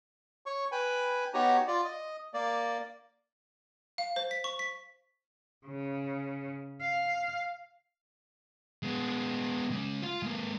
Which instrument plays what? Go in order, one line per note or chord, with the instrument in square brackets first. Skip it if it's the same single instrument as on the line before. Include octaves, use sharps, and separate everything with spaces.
[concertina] C#5 C#6
B4 G5 G#5 B5
B3 D#4 F#4 G4 C#5 A#5
F4 D5
D#5
A#3 D5
[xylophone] F5
C5
B6
C#6
B6
[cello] C#3
F5
[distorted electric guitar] G#3 B3
G#3 C#4
F4 F5
G#3 A#3